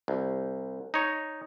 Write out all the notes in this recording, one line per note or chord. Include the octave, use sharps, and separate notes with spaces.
C2
D#4 C#5